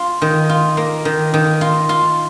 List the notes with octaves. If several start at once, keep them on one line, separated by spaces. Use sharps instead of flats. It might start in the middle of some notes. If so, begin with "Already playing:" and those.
Already playing: F4
D#3
F4
A#3
D#3
D#3
F4
F4